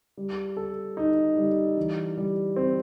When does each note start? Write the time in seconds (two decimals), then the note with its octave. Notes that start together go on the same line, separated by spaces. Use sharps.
0.17 G3
0.57 A4
0.97 D#4
1.37 G3
1.77 E3
2.17 G3
2.56 C4